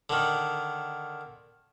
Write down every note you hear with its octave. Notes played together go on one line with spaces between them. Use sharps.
D3 D#3